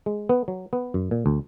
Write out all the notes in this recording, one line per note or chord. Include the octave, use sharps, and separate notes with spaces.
G#3
B3
F#3
B3
F#2
A#2
D2